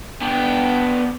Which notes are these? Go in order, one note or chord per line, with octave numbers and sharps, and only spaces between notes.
B3 D4 G5